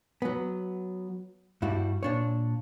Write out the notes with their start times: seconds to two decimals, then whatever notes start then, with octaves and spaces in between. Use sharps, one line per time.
0.22 F#3 B3
1.62 G2 G3 E4 F#4
2.03 A#2 D4 C#5